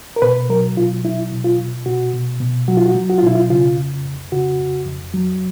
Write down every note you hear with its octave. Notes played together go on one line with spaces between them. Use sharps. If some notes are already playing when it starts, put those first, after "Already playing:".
A#4
B2 B4
F#3 A#4
B2 F4
F#3 E4
B2
F4
B2
B2 F#4
B2
B2
F#3 F#4
F4
F#4
F#3
F#4
F4
B2 E4
F4
C#3 F4
F2
F2
C#3 F#4
F2
F2
F#3